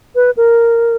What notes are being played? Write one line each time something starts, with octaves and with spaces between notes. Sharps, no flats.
B4
A#4